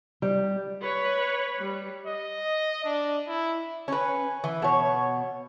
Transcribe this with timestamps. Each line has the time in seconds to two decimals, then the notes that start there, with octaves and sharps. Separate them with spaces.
0.22 G3
0.81 B4 C#5
1.60 G3
2.07 D#5
2.84 D4
3.28 E4
3.88 C#4 B4
4.44 E3
4.62 B2 C#5